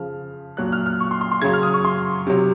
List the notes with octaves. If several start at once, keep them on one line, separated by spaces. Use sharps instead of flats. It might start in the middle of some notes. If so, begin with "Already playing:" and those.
Already playing: C#3 F3 F6
A#2 F#3 F#6
F6
F6
C#6
C6
C6
C6
C#3 F#3 G#6
F6
D#6
C#6
C6
C3 F#3